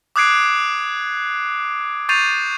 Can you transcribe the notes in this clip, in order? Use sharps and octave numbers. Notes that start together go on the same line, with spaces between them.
D6 D#6 F#6 G#6 C7 D7
C#6 G6 A6 C7 D#7 F7